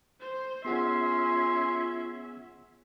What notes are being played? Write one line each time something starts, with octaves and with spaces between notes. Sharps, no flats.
C5
B3 C#4 F4 G#4 E5 F#5 C6